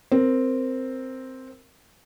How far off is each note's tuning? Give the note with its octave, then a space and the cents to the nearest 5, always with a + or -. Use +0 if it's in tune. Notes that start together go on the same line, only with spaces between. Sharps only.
C4 +0 A#4 +0